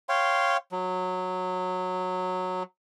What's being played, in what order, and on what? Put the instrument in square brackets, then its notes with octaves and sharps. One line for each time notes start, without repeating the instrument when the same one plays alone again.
[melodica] C#5 F5 G5 C6
F#3